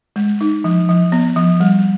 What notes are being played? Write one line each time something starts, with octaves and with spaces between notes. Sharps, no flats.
G#3
D#4
F3
F3
B3
F3
G3